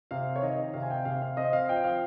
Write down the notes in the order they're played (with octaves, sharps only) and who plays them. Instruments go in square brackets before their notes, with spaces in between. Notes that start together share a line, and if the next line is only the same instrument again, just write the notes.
[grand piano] C3 F5
C#5
D#3 D#5
C3 F5
G#5
G5
C3 F5
F5
C4 D#5
F5
F3 G5
F5